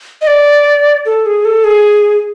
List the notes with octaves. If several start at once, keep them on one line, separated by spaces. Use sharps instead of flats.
D#5
D5
A4
G#4
A4
G#4